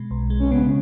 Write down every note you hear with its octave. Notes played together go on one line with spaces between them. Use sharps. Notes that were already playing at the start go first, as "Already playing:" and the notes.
Already playing: B2 G#3
B1
G#3
C#4
C#3 B3